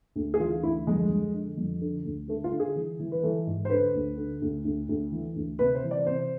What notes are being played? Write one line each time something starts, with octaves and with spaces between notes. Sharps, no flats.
D2
G#4
E3 F4
D2 E4
F2 G#3
F2
D3
F2
D3
D2
D3 A3
F4
D3
G#4
E3
E3
B4
E3 A4
G#2
C5
D3 B4
D2
D3
D2
D2
D2
E3
D2
C3 B4
C5
E3
D5
C3 C5